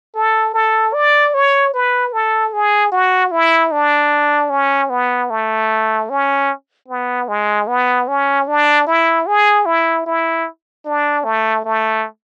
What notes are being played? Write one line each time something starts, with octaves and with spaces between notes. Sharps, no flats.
A4
A4
D5
C#5
B4
A4
G#4
F#4
E4
D4
C#4
B3
A3
C#4
B3
G#3
B3
C#4
D4
E4
G#4
E4
E4
D4
A3
A3